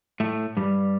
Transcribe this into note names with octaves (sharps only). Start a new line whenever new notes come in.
A2 A3
G2 G3